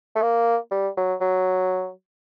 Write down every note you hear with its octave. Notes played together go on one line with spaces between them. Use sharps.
A3
A#3
G3
F#3
F#3